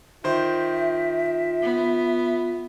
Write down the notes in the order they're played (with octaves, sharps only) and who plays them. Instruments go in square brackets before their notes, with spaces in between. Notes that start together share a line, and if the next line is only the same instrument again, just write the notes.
[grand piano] D#3 C5 [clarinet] F4 [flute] E5
[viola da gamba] B3